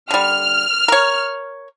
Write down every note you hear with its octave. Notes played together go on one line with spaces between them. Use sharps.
D3 G3 F6
A#4 C#5